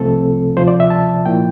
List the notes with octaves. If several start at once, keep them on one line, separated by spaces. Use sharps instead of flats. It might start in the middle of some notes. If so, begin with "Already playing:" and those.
Already playing: C2 C3 F3 A3 C4 A4
D2 C3 F3 C5
D5
E5
A5
A#2 F3 A#3 E4 G5